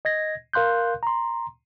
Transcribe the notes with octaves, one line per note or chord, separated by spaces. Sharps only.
D#5 G#6 A#6
A#4 F5 C6 F#6 G6
A#5 C6